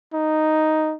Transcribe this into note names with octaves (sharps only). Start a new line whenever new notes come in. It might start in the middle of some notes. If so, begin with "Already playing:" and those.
D#4